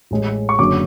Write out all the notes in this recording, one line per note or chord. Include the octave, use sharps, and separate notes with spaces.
A1 A2 G#3
C#6
F#1 F#2 D3 F#3 C#4 D6